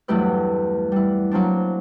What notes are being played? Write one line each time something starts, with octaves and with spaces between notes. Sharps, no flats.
E2 G2 F#3 A3 G4 B4
G3 E4
F#3 A#3 C4 D4